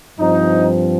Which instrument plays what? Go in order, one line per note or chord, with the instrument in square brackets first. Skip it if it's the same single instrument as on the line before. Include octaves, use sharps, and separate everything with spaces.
[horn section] G2 F3 C4 D#4